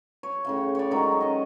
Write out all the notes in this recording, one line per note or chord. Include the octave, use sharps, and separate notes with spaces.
C#5
A2 C#3 F5
C#5 D5
D#3 F#3 G#3
C#4 D#5